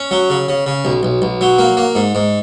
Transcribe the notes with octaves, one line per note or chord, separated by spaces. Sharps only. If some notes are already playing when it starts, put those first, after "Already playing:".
Already playing: C#4
F#3
C#3
C#3
C#3
B1
B1
B1
F#3
A#3
A#3
G#2
G#2